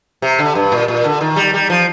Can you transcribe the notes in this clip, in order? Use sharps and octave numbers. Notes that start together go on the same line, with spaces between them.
C3
D3
G2
A#2
A#2
D3
D#3
G3
G3
F3